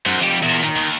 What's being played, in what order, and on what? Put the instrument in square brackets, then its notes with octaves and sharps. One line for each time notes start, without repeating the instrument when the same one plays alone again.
[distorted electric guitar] F#2 [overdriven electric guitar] C5 F#5
[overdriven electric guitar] F2 G4 [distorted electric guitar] G3
[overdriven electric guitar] E2 [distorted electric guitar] A#2
[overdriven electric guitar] D#3
[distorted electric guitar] D#2